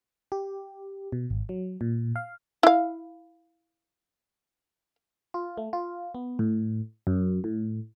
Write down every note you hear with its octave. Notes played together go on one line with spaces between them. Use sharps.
G4
B2
G#1
F#3
A#2
F5
E4 F5
F4
A3
F4
B3
A2
F#2
A2